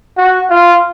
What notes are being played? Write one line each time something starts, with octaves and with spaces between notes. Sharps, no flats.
F#4
F4